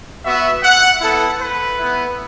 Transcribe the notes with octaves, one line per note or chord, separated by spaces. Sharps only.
B3 F#4 E5
F#5
B3 E4 A4
B4
B3 E4